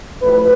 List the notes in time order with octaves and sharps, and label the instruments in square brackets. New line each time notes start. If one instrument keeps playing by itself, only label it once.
[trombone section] A1 A2 F3 B4